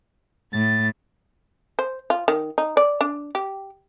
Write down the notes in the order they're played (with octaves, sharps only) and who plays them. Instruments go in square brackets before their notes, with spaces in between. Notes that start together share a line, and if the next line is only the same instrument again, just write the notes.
[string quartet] A2 [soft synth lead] A6
[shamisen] C5
F4
D#3
D#4
D5
D4
G4